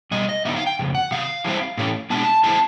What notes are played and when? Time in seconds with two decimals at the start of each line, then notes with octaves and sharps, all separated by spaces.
0.11 B2 G3 D#5
0.29 D#5
0.45 D3 F#3 B3 D#4 E5
0.56 F5
0.67 G5
0.79 F2 C#3
0.95 F#5
1.11 C3 D#3 F5
1.44 E3 G3 C4 E4
1.77 A2 E3 A3 C#4
2.10 B2 G#3 B3 D4 A5
2.44 E3 G#3 C4 E4 A5